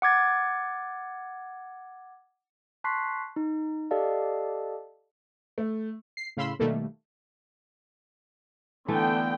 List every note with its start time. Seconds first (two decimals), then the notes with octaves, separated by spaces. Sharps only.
0.02 F#5 D6 G#6 A6
2.84 A5 C6 C#6 F#6 B6 C7
3.36 D#4
3.91 G4 A4 D5 D#5 F5 A5
5.58 A3
6.17 C7
6.37 A2 C#3 F5 B5 C6 E6
6.59 B2 D#3 G3 A3 A#3
8.88 D3 E3 A3 B3 G5